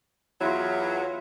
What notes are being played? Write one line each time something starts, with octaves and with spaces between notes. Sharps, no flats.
E2 F#3 E4 F4